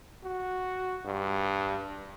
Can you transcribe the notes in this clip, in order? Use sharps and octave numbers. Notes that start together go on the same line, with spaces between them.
F#4
G2